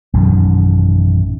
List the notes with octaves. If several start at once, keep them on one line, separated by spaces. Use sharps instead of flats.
A1 F#2 B2 D#3